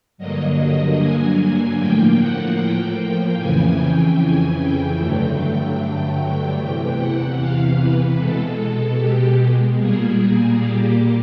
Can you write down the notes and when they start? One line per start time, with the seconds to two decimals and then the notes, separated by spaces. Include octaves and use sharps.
0.18 G2 D3 F#3 A#3 D#5
0.58 D#5
0.98 G#5
1.79 A2 F3 A#3 G5
2.18 F#5
2.58 G5
2.98 G5
3.38 F2 C#3 E3 G#5
3.78 G5
4.18 G#5
4.59 G5
4.98 G2 D3 F#3 A3 G5
6.18 G5
6.57 E2 C3 E3 G5
6.97 F#5
7.38 F5
7.78 B4
8.17 B2 G#3 A4
8.98 G4
9.77 A#2 G3 A#3 G#4
10.58 G4